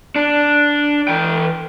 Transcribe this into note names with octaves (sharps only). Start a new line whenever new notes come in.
D4
E3 G5